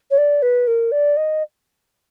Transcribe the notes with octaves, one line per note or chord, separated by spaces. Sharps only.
C#5
D5
B4
A#4
D5
D#5